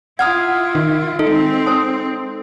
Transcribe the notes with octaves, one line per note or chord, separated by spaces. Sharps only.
E4 F4 F#5 A#5 D#6 F6 G#6
D#3
G#3 C4 D#4 A4
C5 A5 D#6